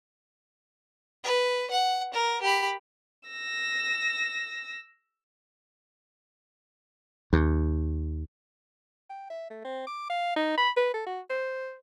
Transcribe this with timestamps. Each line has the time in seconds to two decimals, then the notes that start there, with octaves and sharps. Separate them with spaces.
1.24 B4
1.71 F#5
2.14 A#4
2.42 G4 B5
3.29 E6 A#6
7.33 D#2
9.10 G5
9.30 E5
9.50 A3
9.65 C4
9.87 D6
10.10 F5
10.36 D#4
10.58 B5
10.77 B4
10.94 A4
11.06 F#4
11.30 C5